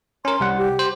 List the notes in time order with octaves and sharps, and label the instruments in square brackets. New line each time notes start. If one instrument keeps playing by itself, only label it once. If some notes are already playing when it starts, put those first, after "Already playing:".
[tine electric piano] C#4 A#4 [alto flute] C6
[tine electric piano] C2 G3 F#5
[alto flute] G4
[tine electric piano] C5